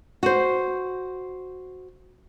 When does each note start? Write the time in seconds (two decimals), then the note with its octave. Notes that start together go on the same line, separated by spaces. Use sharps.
0.23 F#4 C5